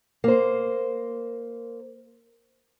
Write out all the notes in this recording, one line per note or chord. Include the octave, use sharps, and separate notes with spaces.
A#3 C5